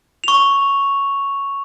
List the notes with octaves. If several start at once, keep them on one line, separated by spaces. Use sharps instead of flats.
C#6 F7